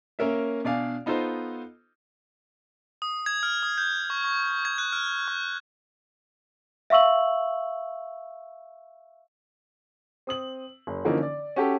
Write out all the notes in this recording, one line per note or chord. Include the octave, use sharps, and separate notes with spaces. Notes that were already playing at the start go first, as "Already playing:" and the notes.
A#3 C#4 A#4 E5
B2 D4 D5 F5 G#5
B3 D#4 F4 A4 C5 D#5
D#6
G#6
F6
D#6
G6
C#6
C#6
G#6
F#6
F6
C#6
E5 F5 C#6 E6 F#7
C4 D#6 F#7
F#1
D3 E3 F3 A#3 C#4 D#4
D5
C#4 F#4 G4 A4